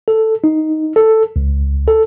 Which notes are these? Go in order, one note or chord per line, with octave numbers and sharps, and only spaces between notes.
A4
D#4
A4
C#2
A4